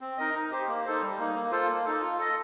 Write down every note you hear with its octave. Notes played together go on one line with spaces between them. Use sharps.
C4
D#4 A#4 D#5
D#4
G4 C5
A#3
D#4 A4 C5
G3
A#3 D#4
A#3
F4 A4 C5
A#3
D#4 A4
F4
A4 D#5